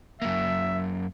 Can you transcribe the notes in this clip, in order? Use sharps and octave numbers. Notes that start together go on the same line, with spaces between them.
F#2 A#3 E5